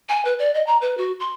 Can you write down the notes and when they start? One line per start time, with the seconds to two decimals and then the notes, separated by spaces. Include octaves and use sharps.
0.09 G#5
0.25 B4
0.39 D5
0.54 D#5
0.67 A#5
0.81 B4
0.97 F#4
1.20 C6